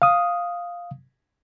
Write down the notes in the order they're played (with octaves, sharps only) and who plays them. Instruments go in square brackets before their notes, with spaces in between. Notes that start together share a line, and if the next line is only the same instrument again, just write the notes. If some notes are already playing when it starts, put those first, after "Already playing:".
[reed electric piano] F5 D#6